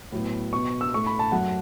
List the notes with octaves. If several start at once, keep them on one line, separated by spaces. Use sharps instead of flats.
A2 F#3 B3
B2 B3 C#6
E6
A2 A3 C#6
B5
A5
F#2 F#3 A3 F#5